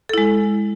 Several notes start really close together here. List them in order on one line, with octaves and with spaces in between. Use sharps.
A4 E4 G#3